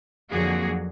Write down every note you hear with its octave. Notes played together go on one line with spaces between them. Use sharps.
F2 D3 F#3 A#3 F#4 G#4